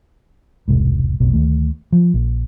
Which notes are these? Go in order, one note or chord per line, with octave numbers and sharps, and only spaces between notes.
E1 C2 G#2
F1 B1 B2
D2 D#3 A3
F3
A#1